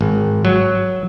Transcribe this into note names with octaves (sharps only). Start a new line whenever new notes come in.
G#1
F#3